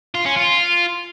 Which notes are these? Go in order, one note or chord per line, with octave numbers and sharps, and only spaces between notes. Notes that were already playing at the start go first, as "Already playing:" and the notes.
F4
C#4
F4